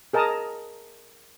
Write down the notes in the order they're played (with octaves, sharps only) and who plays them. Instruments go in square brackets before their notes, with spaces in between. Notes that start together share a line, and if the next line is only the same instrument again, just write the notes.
[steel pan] G#4 A#4 D#5 A5 A#5 D#6